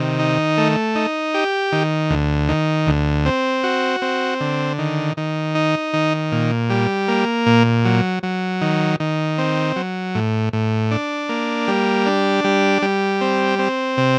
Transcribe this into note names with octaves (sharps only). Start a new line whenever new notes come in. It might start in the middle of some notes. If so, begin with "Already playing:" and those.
Already playing: C3 D#3
D#4
A3
D#4
G4
D#3
D2
D#3
D2
C4
F#4
C4
D3
D#3
D#3
D#4
D#3
A#2
G3
A#3
A#2
F#3
F#3
D#3
D#3
C4
F#3
A2
A2
D4
A#3
G3
D4
G3
G3
C4
C4
C3